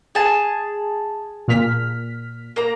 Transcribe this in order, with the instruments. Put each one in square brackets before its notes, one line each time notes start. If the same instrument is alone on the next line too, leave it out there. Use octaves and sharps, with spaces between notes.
[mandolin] G#4 A5
[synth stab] A#2 F6 B6
[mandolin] A#3 A#5